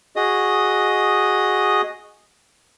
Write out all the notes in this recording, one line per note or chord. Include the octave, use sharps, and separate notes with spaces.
F#4 G#4 D#5 D#6